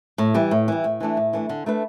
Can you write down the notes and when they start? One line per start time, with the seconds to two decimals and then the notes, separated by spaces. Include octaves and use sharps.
0.18 A2
0.34 E3 G3
0.51 A2
0.68 E3 G3
0.84 A2
1.00 E3 A3 D4
1.17 A2
1.33 E3 A3 D4
1.49 D3
1.66 A3 D4 B4